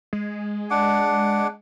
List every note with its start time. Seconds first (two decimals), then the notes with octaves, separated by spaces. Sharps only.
0.13 G#3
0.71 D4 F#5 D6